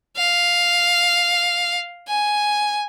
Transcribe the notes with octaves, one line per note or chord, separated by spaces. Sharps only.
F5
G#5